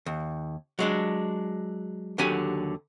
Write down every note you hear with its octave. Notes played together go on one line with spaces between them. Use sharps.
D#2
F#3 G#3 D4
D#2 D3 F#3 G4 G#5